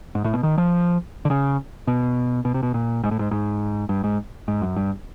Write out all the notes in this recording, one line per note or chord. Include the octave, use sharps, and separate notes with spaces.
G#2
A2
B2
D#3
F3
D3
C#3
B2
B2
C3
B2
A#2
G#2
A2
G#2
G#2
G2
G#2
G#2
F#2
G2